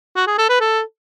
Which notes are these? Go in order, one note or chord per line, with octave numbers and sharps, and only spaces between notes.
F#4
G#4
A4
B4
A4